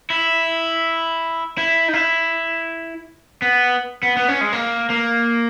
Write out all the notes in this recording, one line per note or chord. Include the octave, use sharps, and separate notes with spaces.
E4
E4
D#4
E4
B3
B3
B3
C#4
G#3
A#3
A#3